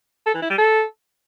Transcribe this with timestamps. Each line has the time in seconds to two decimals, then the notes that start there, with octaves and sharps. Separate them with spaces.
0.26 A4
0.34 E3
0.42 E4
0.50 G3
0.58 A4